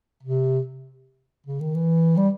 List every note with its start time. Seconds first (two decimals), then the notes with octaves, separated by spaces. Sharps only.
0.23 C3
1.46 C#3
1.60 D#3
1.75 E3
2.17 G3